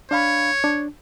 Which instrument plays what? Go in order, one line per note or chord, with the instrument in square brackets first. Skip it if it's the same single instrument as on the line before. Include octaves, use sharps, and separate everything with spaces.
[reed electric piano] D4 F5 B5 [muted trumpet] C#5
[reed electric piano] D4